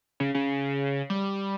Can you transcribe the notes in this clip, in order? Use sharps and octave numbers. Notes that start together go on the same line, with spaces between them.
C#3
C#3
G3